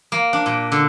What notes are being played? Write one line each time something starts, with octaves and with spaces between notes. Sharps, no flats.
A#3
D4
A#2
D3